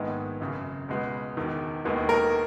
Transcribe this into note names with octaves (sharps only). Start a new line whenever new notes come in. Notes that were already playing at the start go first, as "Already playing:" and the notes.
Already playing: A#1 G#2 D#3 G#3 B3
G#1 F#2 C#3
C#2 B2 G#3 B3
E1 E2 D#3
E1 D#2 D#3 G#3 B3
A#4